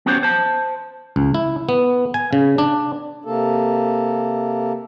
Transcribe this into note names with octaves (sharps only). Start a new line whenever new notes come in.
B3 C#4 F#4 G4 C5 C#5
C5 A5
C#2
E4
B3
G#5
C#3
D4
C3 A#3 A4